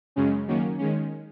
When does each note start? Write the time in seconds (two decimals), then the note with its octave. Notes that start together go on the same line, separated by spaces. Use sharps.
0.16 F#2 C#3 G#3 C#4
0.48 D#3 F#3 A#3 C#4
0.78 D#3 G#3 C#4